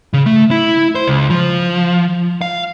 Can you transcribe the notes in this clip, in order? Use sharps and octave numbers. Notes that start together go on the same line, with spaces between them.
C#3
A3
E4
C5
C#2
F3
F5